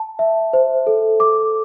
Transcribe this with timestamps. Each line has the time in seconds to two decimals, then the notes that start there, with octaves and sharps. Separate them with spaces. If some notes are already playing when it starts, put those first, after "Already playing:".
Already playing: A5
0.19 E5
0.53 C5
0.87 A4
1.20 D6